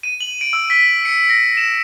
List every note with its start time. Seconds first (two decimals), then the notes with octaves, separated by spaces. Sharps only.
0.03 D#7
0.21 F#7
0.41 D7
0.53 E6
0.70 B6
1.05 C#7
1.29 A#6
1.57 E7